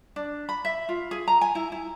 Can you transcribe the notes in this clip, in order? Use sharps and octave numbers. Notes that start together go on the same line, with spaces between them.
D4
B5
E5
F4
G#4
A#5
G#5
E4
E4